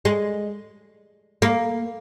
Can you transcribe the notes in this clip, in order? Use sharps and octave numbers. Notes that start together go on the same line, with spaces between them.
G#3
A#3